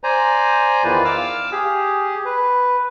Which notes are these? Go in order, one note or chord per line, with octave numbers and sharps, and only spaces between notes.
C5 D5 G#5 A#5
E2 D#3 E3 F4 B4 D5
F5 D6 E6 F6
G4 G#4
B4